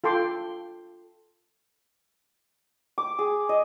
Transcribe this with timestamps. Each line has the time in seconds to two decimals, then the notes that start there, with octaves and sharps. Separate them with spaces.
0.04 F4 A4 G5 C6 D6
2.98 D6
3.19 G#4
3.49 D#5